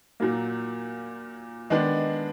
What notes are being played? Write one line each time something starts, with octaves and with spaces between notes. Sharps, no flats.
A#2 F#3 A#3
D#3 G#3 B3 D4